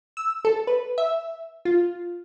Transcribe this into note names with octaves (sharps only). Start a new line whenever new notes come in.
E6
A4
B4
E5
F4